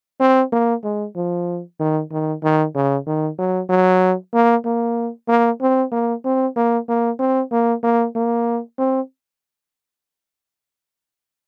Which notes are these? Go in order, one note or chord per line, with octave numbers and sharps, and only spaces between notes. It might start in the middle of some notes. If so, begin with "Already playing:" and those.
C4
A#3
G#3
F3
D#3
D#3
D#3
C#3
D#3
F#3
F#3
A#3
A#3
A#3
C4
A#3
C4
A#3
A#3
C4
A#3
A#3
A#3
C4